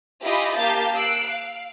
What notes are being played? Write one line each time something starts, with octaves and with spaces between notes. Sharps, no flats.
E4 F4 G4 D#5 G#5 B5
A#3 G4 F5 A5 G6 A6
E6 F#6 C7 D7
F5